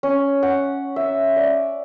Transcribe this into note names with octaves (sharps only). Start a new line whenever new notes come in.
C#4
F#5
E5
D5